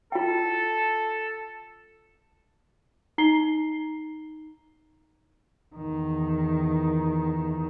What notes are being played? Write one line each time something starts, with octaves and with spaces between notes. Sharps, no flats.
F4 A4 G5
D#4 A#5 C7 G7
E2 D#3